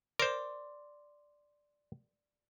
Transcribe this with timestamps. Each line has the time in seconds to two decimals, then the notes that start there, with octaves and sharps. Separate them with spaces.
0.19 A#4 C5 D5 C6 D6